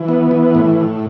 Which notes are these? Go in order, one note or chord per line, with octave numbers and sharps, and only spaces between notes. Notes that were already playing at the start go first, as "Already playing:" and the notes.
Already playing: E3
B3
E3
A2